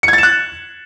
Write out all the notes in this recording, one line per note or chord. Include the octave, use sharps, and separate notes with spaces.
F#6 G#6 A6 C#7 E7